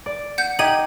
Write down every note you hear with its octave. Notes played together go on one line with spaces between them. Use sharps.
D5
F#5 G6
D#4 G4 F#5 G#6 D#7 F#7